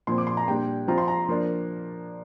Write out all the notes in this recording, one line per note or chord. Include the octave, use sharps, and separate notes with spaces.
A#2 F3 C4 C6
D6
C6
A#5
A#2 G3 D4 G5
F3 C4 F4 A#5
C6
A#5
F3 A#3 D4